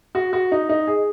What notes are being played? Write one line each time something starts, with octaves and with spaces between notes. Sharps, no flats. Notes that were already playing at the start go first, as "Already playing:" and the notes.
F#4
F#4
D#4
D#4
G#4